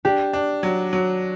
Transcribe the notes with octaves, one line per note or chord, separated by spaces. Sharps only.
D4 G4
D4
F#3
F#3